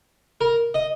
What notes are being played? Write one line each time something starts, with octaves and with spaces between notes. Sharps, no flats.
A#4
D#5